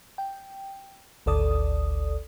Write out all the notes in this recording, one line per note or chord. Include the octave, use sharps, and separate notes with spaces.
G5
G#1 D2 A4 D5 D#6